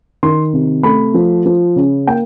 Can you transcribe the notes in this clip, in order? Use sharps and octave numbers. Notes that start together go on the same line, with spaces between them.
D#3 C6
C3
A3 B5
F3
F3
C#3
A#3 G5